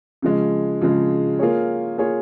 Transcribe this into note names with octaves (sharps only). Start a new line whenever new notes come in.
C#3 F3 G#3
C#3 F3 G#3
A#3 F4 G#4 C#5
A#3 F4 G#4 C#5